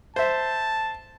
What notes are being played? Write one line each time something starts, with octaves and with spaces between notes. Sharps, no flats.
C5 E5 A5